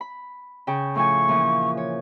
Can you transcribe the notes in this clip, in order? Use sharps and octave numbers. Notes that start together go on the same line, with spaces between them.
B5
C#3 G5 C#6
A2 F3 G#5 C#6
A#2 E3 F3
C#5